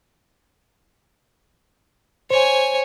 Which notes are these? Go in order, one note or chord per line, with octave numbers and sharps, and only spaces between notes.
C5 C#5 G#5